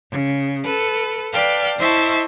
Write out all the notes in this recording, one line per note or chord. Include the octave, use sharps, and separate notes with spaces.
C#3
A4 B4
B4 D5 F5 G5 A5
E4 C5 D#5 E5 A5 C#6